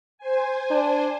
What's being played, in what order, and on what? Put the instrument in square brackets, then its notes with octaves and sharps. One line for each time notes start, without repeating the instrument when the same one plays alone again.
[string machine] C5 G#5
[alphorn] D4